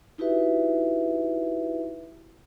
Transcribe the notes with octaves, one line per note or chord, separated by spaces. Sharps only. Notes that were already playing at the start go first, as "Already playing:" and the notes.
D#4 E4 F#4 G4 B4 E5